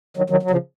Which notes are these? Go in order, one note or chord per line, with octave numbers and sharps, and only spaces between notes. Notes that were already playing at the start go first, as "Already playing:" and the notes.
D#3 F#3
D#3 F#3
F#3
C#3 F3